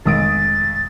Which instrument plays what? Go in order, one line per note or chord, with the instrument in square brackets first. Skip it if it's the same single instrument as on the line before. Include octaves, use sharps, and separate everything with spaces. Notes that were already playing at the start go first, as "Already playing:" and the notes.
[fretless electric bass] F1 D#3 G#3 [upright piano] B1 D#6 D7 [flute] A6